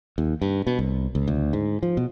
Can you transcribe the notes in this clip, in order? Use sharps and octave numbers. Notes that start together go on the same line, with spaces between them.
D#2
G2
B2
C2
C#2
D2
G#2
F3
B2